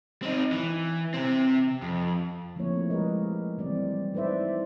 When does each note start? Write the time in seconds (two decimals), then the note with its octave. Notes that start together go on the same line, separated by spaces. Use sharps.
0.22 C4 D#4
0.52 E3
1.14 C3 C4
1.82 F2
2.56 F3 A3 A#3 C4 E4 C#5
2.90 G#3 G4 A#4 B4 D#5
3.58 E3 G3 C4 D5
3.76 G3
4.14 D#4 E4 B4 C5 D5 E5